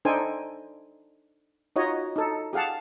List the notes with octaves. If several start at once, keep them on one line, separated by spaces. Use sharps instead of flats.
D4 D#4 A4 C5 G5 G#5
D#4 F4 F#4 C#5 D#5
D#4 A4
G4 G#4 F5 F#5 A5